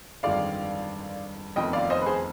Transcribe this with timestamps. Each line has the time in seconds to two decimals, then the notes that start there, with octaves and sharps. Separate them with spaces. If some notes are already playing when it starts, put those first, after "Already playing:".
0.23 G1 F2 D#3 G#3 D5 F5
1.56 F1 F2 D#3 B3 D#5 G5
1.73 D5 F5
1.90 C5 D#5
2.01 B4
2.06 G#4 C5